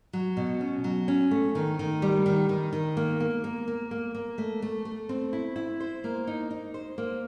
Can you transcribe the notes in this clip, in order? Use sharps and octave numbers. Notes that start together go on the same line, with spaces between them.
F#3
B2
C#4
F#3
C#4
A3
D#3
D#3
G3
D#3
D#3
D#3
A#3
A#3
A#3
A#3
A#3
A#3
A3
A3
A3
C4
E4
E4
C5
A#3
D#4
D#4
C5
A#3